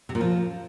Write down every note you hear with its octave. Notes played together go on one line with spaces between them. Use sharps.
C3
A#2
F3